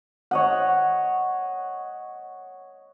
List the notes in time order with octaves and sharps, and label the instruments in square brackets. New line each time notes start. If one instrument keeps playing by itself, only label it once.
[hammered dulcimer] C#5 D#5 F#5